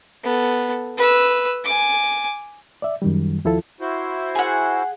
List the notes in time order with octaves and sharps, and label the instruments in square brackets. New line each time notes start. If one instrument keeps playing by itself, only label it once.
[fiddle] B3 A4
B4 E6
G#5 D6
[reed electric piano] D5 E5
F#2 D#3 G3
D#2 F3 E4 F4 A4
[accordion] E4 F#4 C5
[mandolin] G#4 F#5